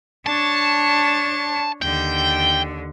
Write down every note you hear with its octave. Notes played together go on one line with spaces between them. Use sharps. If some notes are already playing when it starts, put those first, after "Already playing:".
D4 C#5 A5
D#2 D3 G5